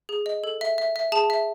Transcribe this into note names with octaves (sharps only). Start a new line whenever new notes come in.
G#4
D#5
A4
E5
E5
E5
G#4 A5
E5